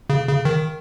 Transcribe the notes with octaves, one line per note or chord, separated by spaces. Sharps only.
C#3
C#3
D#3